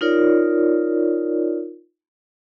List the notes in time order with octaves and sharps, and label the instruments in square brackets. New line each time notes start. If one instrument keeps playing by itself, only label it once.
[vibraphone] D#4 F4 A#4 C#5 D5